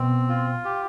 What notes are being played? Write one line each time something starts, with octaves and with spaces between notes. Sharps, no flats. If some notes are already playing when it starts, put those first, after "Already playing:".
Already playing: B2 C4
F4
G4